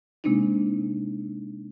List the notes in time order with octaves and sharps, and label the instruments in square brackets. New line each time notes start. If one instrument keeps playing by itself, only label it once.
[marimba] C3 G#3 A#3 C4 D4 D#4